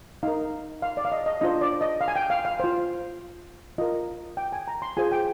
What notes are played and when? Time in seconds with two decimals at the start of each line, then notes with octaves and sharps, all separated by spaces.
0.23 D#4 A#4 F5
0.82 F5
0.97 D5
1.05 F5
1.12 D#5
1.26 D#5
1.41 D4 F4 C5 D#5
1.61 D5
1.81 D#5
2.01 F5
2.08 G#5
2.16 G5
2.30 F5
2.45 F5
2.60 F4 C5
3.78 F4 A#4 D#5
4.37 G5
4.52 G#5
4.68 A#5
4.82 C6
4.97 F4 G#4 C5 G#5
5.12 G5